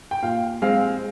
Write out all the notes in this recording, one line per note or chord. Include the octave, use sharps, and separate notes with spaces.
G5
A#2 F5
G#3 C4 F5